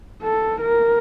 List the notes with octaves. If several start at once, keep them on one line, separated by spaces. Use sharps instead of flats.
A4
A#4